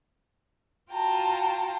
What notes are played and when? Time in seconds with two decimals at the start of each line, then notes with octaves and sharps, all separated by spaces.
0.91 F4 F#4 G5 A5 A#5